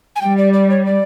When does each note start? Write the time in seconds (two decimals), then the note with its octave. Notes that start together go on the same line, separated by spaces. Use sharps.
0.16 G#5
0.21 G3 G5
0.38 D5
0.53 D5
0.70 C#5
0.86 D5